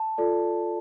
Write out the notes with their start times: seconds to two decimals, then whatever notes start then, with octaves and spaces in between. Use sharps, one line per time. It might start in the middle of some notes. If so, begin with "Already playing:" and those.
Already playing: A5
0.18 F4 A4 D5